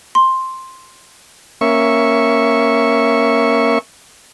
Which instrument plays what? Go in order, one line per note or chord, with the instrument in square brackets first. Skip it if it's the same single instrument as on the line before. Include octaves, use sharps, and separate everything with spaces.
[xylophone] C6
[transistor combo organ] A#3 C#4 E5 C#6